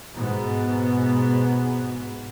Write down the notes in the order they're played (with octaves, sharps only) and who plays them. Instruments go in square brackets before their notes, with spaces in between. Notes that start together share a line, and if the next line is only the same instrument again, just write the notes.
[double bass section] G#2 B2 B3